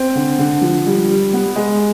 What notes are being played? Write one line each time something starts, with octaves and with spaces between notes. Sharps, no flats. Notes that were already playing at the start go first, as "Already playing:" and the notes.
Already playing: C4
D3
D3
F3
G3
G3
B3
G#3